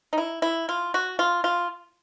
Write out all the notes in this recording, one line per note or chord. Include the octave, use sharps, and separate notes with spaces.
D#4
E4
E4
F4
F#4
F4
F4